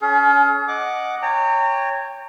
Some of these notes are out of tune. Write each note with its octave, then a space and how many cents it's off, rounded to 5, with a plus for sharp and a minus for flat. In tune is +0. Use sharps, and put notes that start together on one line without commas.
C#4 +25 G#4 +45
D#5 +0 F#5 +0 D6 +0
C#5 +0 G5 +20 A#5 -30